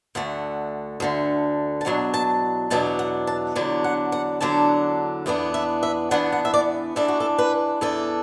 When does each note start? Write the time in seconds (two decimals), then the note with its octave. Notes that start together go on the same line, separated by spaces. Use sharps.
0.15 D2 D3 A3 F#5
1.00 D2 D3 A3
1.81 A5
1.85 E2 B2 F#3 D4 F#5
2.14 A5
2.70 E2 B2 F#3 D4 A5
2.99 F#5
3.27 A5
3.56 E2 D3 F#3 D4
3.84 F#5
4.12 F#5
4.41 E2 D3 F#3 D4 A5
5.26 E2 E3 B3 D4 F#5
5.54 E5
5.83 E5
6.11 E2 E3 B3 D4 F#5
6.33 F#5
6.45 E5
6.54 D5
6.96 E2 E3 D4 A4
7.08 F#4
7.20 A4
7.38 B4
7.81 E2 E3 D4 A4